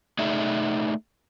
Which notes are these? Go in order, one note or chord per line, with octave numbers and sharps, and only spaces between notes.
A3 D#4 G#4 D5 E5